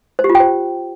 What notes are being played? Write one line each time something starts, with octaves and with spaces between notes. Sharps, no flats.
C5
G4
F4
G5
C5